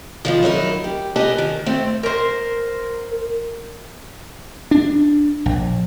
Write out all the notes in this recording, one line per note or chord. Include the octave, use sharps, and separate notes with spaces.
D#3 F3 B3
F#3 D#4 E4 A#4
G4
G4 A#4 B4 D#5 G#5 A5
D#3
A3 C4
A#4 C5
D4
A#1